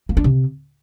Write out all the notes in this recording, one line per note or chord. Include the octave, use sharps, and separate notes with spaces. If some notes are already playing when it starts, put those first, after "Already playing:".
A#3
D4
C3